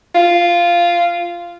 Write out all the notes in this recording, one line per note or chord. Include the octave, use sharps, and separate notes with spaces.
F4